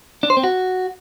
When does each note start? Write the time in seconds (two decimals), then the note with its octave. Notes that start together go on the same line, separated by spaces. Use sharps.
0.23 D4
0.30 C5
0.37 C4
0.44 F#4